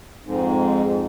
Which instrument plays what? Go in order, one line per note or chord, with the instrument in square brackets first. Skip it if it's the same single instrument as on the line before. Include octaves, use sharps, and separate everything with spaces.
[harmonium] F2 G#2